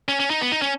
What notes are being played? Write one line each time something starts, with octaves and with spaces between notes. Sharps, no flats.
C#4
C#4
D#4
B3
D#4
C#4